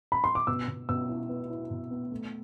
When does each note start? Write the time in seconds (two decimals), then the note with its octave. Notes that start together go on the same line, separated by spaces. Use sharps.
0.12 B5
0.24 C6
0.35 D6
0.47 B2 E6
0.68 B2
0.89 B2 E6
1.09 E4
1.29 B3
1.50 E4
1.71 B2
1.91 B3
2.11 A3